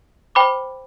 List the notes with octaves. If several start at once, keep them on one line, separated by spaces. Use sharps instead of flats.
C5 G5 B5 D6